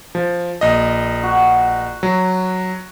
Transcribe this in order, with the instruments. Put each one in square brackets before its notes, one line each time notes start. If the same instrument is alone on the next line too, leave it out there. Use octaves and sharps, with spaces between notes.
[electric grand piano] F3
A#1 D#5
[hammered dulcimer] F#4
[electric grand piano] F#3